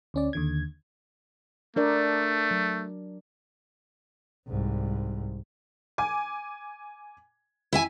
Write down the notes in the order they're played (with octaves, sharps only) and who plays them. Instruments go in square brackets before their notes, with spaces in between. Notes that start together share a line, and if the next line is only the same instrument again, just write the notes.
[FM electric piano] D2 C#4 D5
D#2 D3 G#6
[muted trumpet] A3 [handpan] D4 A#4 D5
[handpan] F#3
[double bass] C2 G#2
[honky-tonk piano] G#5 D6
[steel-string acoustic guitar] E4 E5 G#5